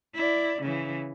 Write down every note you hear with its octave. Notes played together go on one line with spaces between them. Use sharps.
E4 D5
C#3 E3